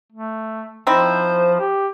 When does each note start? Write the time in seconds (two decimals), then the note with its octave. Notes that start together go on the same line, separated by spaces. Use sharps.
0.12 A3
0.87 F3 C4 D#4 E4 C5
1.60 G4